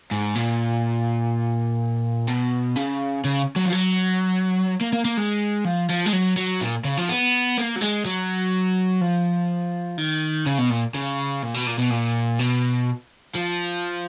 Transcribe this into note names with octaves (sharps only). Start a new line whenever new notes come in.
G#2
A#2
B2
C#3
C#3
F#3
F3
F#3
A#3
A#3
A#3
G#3
F3
F3
G#3
F#3
F#3
A#2
C#3
F3
B3
A#3
F#3
G#3
F#3
F3
D#3
C#3
B2
A#2
C#3
A#2
B2
A#2
B2
A#2
B2
F3